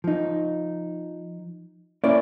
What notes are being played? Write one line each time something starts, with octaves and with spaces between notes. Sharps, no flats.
F3 D#4
A#3 C#4 E4 A#4 C#5 D5